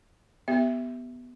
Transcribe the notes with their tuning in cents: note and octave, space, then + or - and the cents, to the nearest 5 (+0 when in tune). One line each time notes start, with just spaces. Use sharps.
B3 +0 G4 +0 E5 +0